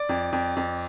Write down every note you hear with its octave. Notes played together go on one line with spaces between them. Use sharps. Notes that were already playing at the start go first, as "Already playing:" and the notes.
Already playing: D5
F2
F2
F2